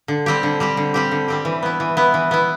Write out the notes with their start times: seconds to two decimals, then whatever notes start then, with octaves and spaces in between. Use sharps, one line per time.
0.08 D3
0.26 G3 C4 G4
0.43 D3
0.60 G3 C4 G4
0.77 D3
0.94 G3 C4 G4
1.11 D3
1.28 G3 C4 G4
1.45 E3
1.63 B3 E4
1.80 E3
1.97 B3 E4
2.14 E3
2.31 B3 E4